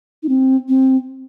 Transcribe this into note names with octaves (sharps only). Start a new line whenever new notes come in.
D#4
C4
C4